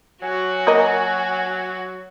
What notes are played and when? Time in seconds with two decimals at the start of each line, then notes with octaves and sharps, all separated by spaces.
0.22 F#3 F#4 G#5
0.67 A#3 A#4 D#5